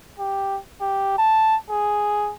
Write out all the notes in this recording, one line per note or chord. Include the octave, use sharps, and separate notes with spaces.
G4
G4
A5
G#4